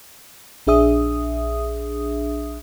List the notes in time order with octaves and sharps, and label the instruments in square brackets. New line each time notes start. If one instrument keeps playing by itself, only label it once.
[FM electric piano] A#1 D4 G#4 E5 D#6